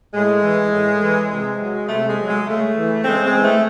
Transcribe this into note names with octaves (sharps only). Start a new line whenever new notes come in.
A2 G#3
E3
A2
E3
C3 G#3
F#3
C3 A3
G#3
F#3
G#3
C#3 A3
E3
C#3 G#3 C4
G#3 C4
E3
A3